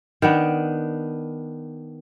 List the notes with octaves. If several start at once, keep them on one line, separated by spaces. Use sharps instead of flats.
D#3 B3 D4